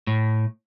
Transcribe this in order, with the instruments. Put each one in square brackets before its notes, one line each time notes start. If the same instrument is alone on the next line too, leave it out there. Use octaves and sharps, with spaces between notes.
[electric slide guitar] A2